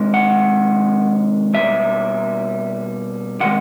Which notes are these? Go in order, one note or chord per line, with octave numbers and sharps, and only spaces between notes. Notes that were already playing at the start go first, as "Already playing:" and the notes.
Already playing: C3 D#3 G#3
F#5
B2 G3 A#3 E5
C3 D#3 G#3 F#5